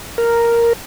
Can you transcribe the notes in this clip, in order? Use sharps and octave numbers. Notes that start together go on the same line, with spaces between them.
A#4